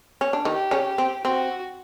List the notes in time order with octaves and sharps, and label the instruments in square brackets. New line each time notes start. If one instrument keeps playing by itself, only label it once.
[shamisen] C#4
D4
[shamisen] D#3 D#4 [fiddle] G4
[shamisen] C#3 C#4
C4
[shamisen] C4 [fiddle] F#4